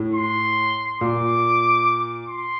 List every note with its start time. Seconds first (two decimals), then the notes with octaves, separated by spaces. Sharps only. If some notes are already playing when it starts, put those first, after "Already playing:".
Already playing: A2
0.15 C6
1.00 A#2 D6
2.28 C6